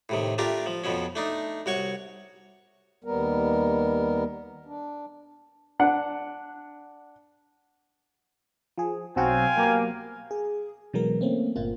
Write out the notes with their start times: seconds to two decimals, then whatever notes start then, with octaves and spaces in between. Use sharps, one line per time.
0.09 A2 C3 D#3
0.38 A3 D4 F4 G4 A#4
0.66 F3
0.84 F2 B2 F3 C#4
1.15 A3 D4 D#4
1.66 C2 F#4 C#5 C#6
3.04 D#2 G3 B3 A#4
4.66 D4
5.79 D4 F#5
8.78 F3 G#4
9.16 B1 F#3 C4 F#4 F5 G5 G#5
9.57 F#3 A#3 B3 G4
10.31 G#4
10.94 B2 E3 F#3 G#3 B3 A#4
11.21 A3 A#3 C4 C#4
11.56 G1 A#2 A#3 F4